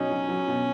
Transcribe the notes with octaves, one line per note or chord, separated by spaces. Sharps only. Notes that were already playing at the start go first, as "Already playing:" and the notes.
Already playing: B2 F#3 C#4 D#4
F#3
F#3
B2